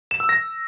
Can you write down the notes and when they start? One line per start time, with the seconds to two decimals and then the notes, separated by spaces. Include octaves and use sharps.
0.11 E7
0.20 E6
0.29 A#6